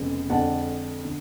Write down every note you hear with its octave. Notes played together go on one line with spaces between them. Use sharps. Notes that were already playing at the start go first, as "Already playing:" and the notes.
Already playing: F1 F2 C#3 G#3 B3
F2 D3 G#3 D4 F#5 A5
D3